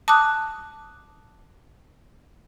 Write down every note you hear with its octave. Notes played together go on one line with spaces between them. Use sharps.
A5 D6 D#6 F#6